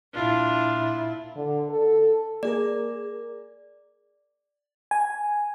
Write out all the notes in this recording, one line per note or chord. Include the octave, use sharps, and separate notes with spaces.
A#2 D4 E4 F4
D3
A4
A#3 G#4 A#4 D5
G#5